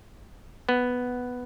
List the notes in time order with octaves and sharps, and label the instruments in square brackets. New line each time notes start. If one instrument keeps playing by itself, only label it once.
[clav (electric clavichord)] B3